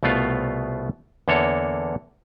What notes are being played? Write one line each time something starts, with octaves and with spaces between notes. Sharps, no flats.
C2 B2 A3 B3 F4 F5
E2 D3 A#3 A4 C#5